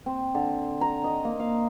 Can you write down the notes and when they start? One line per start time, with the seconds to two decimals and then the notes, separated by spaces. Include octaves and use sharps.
0.06 C4
0.34 D3
0.81 A#5
1.04 D#5
1.25 A#3
1.40 F5